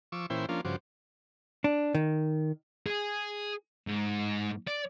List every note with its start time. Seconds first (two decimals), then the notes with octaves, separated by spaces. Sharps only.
0.12 F3 C#6 D6 E6
0.30 A#2 E3 C#4 E4 C5 G5
0.49 F3 A#3 C#4 D4 F4
0.65 G2 C#3 F3 F#4 C5 D6
1.64 D4
1.95 D#3
2.86 G#4
3.88 G#2
4.67 D5